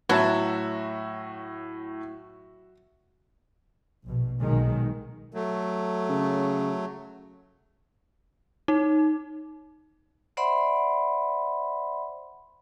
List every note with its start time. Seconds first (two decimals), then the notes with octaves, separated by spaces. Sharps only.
0.09 A2 F#3 F#4 B4 C#5 E5 A5
4.04 A#1 B2
4.40 B1 D#3 G#3
5.34 F#3 A3 A4
6.09 C#3
8.68 D#4
10.37 C5 D5 E5 F#5 B5 C6